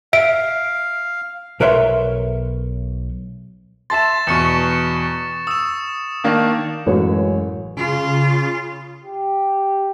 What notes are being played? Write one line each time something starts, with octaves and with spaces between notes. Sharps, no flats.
E5 F5 D7
B1 A#4 B4 C#5 E5 C6
E5 A5 C6 A6 E7
E2 B2 C#6 C#7 E7
D#6 E6 E7
D#3 A#3 D4
A1 F#2 G#3 B4 C#5
C#3 F4
G4